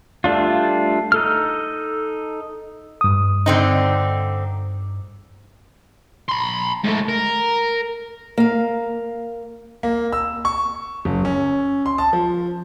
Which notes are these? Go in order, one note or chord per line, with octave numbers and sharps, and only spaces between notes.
G3 A3 D4 F4
D#4 A4 F6
G2 D#6
D3 C4 D#4
B5 C6
G#2 A3
A#4
A#3 F5
A#3
E6
C#6
F#1
C#4
C6
A5
F3